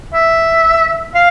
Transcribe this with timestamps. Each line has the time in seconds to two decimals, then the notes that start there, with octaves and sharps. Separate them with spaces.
0.14 E5
1.15 F5